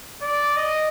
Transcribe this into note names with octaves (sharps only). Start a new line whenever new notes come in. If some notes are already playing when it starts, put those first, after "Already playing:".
D5
D#5